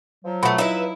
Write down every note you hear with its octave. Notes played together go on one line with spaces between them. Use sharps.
F3 F#3
B2 A3 F#5 B5
D#4 E4 B4 E5